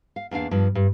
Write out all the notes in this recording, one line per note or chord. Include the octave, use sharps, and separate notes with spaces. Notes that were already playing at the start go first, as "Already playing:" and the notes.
F5
E2 A#3 D4 F5
G2 F3
G2